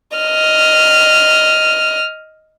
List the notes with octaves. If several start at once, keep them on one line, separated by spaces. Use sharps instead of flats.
D#5 F6